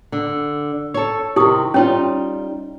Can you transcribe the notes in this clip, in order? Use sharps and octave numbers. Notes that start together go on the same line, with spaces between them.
D3
A4 C#5
C3 D#3 E4 G4 D#6
G3 C#4 D#4 F4 C#5